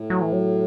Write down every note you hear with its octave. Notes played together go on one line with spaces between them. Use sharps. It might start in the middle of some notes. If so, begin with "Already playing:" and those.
Already playing: A2
F#3
E3
F#3